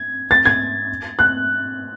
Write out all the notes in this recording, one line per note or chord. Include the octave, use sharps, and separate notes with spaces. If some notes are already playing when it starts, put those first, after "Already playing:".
Already playing: G#6
A6
G#6
F#6